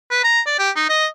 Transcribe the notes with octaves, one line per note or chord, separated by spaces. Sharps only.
B4
A#5
D5
G4
D#4
D#5